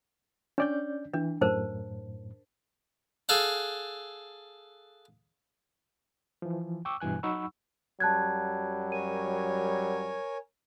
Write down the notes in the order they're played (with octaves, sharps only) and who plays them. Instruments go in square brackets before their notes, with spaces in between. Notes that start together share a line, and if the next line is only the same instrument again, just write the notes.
[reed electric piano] C#4 D5 G6 [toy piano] D4
[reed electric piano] E3 [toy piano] D4
[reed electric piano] F#2 A2 [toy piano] A#4 C5 A5
[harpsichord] G#4 A4 F5 F#5
[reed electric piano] E3 F3
G5 C#6 D6 E6
G2 B2 E3 G#5 F#6
F#3 D#4 F#5 B5 C#6 E6
[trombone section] F#2 F#3 G3 [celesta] A5 F#6 G#6
[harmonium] A#4 C#5 G#5 [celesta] D#7